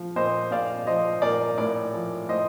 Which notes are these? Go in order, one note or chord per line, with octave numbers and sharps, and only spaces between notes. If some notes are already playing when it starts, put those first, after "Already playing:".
Already playing: F3
A#2 C5 D#5
A#2 D5 F5
F3 C5 D#5
A#2 A#4 D5
A2 A#4 D5
F3
A2 C5 D#5